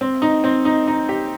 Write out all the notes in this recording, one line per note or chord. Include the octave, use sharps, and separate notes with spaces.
C4
D#4
C4
D#4
D#4
G4